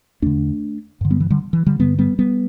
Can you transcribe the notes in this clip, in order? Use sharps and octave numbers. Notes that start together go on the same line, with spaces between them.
E2 D3 A3 D4
G2 D3
G3 B3
E3
D3 G3
E3
D3 G3
G2 D3 G3 B3
G3 B3
G3 B3